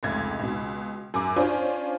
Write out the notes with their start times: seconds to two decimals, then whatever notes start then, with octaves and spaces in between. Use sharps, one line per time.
0.03 F1 C#2 G#6
0.39 C#2 B2
1.14 F#2 D6
1.36 C#4 D4 F4 C5